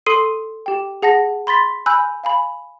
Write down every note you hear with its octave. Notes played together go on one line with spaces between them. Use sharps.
A4 C6 D#6 C7 D#7
G4 G5
G#4 F#5 A5 A#6
B5 C6 A6 B6
G#5 B5 E6 F#6 G6
F5 G#5 B5